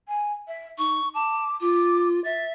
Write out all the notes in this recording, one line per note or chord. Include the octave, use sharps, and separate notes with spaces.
G#5
E5
D#4 C#6
A5 D6
F4 D6
E5 A6